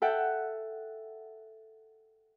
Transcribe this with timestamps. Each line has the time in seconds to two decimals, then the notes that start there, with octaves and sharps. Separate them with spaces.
0.02 A4 E5 F#5 G5